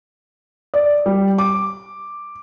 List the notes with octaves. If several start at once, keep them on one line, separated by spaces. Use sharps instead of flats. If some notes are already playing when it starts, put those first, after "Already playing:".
D5
G3
D6